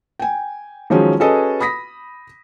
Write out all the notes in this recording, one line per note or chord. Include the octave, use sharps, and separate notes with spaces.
G5 G#5
D#3 F3 F#3 G#3 C#4
C#4 F#4 G#4 A4 B4 D#5
B5 D#6 A#6 B6